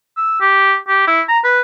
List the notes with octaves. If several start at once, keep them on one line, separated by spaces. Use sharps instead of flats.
E6
G4
G4
E4
A#5
B4